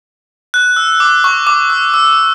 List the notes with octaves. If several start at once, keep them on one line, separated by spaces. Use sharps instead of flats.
F#6
E6
D6
C#6
D6
E6
E6